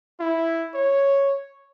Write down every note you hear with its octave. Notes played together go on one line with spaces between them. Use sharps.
E4
C#5